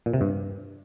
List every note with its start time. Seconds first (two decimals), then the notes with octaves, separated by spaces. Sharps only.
0.06 A#2
0.14 C3
0.21 G2